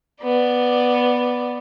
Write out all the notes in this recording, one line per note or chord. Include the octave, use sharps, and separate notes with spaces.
B3 D5